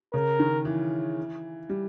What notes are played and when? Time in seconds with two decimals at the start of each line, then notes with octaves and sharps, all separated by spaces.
0.14 C#3 A#4
0.39 D#3
0.65 E3
1.69 G3